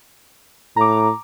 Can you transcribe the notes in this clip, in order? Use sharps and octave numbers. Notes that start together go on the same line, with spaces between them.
A2 A#5 D6